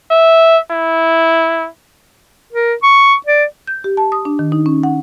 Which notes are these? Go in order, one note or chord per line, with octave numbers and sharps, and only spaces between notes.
E5
E4
A#4
C#6
D5
G6
G4
A5
D#6
D4
D#3
D#4
C#4
F#5